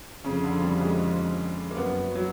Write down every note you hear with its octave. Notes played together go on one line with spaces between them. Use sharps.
F2 C#3
D3
G3
G#3
A#3
F#2 B3
F#3